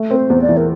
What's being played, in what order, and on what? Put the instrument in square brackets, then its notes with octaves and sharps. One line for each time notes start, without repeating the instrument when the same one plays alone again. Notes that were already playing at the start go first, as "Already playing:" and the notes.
Already playing: [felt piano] A3
[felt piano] C4 [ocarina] A#4
[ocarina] C5
[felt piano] E2
[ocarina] D5
[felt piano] E3
[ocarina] A#4